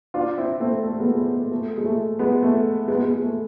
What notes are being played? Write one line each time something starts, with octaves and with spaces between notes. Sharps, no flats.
D4 F4
C4 E4
A3 C4
A3
G#3 B3
G#3 B3
A3
A3
G#3
A3
G#3 B3
A3
G#3 B3
G#3
A3